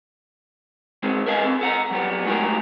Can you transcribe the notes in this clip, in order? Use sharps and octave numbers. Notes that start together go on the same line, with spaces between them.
D#3 G#3 B3 C4
A#4 B4 D#5 F5 G5 G#5
C4 A4
A4 F#5 A#5
F#3 G3 B3
G#3 A3 D#4 F#4 G4 A#4